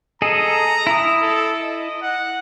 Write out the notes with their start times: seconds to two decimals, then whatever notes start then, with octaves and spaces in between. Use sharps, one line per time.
0.22 G#4 A4 D#5 A#5
0.87 E4 D#6
1.22 A4
1.61 D#5
2.02 F#5